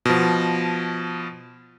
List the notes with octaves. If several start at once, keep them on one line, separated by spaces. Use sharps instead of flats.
B2 F3